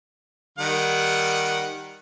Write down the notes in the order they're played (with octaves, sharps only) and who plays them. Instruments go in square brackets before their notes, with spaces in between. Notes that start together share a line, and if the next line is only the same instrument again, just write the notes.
[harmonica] D#3 G3 F#5